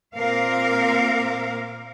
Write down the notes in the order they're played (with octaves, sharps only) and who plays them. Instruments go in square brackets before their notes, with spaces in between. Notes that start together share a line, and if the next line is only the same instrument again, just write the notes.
[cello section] A#2 A#3 C4 A#4 F5